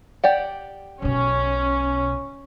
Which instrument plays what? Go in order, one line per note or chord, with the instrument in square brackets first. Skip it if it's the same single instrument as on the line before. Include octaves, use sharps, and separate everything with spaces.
[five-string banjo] G4 D5 F#5
[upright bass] B1 B2 [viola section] C#4